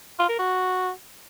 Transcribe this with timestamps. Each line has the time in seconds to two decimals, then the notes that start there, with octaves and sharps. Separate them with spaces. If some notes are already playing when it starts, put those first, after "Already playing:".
0.19 F4
0.29 A#4
0.39 F#4